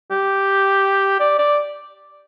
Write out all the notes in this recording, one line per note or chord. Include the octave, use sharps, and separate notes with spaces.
G4
D5
D5